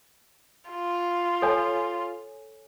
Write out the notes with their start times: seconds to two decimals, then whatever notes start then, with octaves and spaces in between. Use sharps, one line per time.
0.70 F4
1.42 A4 C#5 G#5